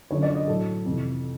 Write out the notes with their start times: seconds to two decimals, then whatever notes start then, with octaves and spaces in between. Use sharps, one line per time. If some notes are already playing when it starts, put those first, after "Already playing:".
0.11 F#2 D3 F3 C#5
0.23 D5
0.35 D#5
0.48 A2 F#3 A4
0.85 F2 C3 E3